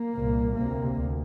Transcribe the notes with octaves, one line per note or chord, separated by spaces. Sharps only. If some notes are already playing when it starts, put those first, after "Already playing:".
Already playing: A#3
C2 A#2
D2 C3 A#3
D2